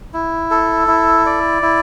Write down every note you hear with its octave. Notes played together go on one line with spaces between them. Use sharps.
E4
A4
E4
D5
E4